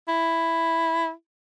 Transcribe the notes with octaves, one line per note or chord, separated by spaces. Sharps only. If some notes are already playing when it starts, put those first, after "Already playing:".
E4